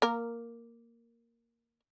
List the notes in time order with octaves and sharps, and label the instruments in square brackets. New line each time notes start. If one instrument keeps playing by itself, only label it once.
[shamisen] A#3 A#4